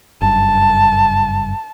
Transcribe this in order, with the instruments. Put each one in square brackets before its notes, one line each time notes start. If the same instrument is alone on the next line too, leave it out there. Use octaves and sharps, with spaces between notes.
[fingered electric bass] F#1 G2 [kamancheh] A5